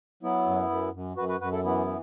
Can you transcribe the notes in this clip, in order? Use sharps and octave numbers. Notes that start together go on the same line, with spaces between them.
F#3 B3 E4
F#2
F#2
F#2
F#2 F#4 B4
F#4 B4
F#2 F#4 B4
E4 A4
E3 B3 E4
E3